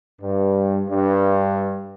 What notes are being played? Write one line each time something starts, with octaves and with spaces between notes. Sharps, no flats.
G2
G2